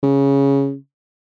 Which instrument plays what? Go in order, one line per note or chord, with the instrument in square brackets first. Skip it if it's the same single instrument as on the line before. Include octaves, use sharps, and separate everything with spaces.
[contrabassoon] C#3